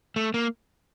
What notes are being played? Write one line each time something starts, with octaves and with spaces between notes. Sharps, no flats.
A3
A#3